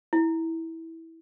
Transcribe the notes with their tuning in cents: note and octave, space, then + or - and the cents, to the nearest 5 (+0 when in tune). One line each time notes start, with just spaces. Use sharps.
E4 -15